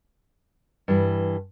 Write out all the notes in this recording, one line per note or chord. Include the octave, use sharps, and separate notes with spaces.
G2 E3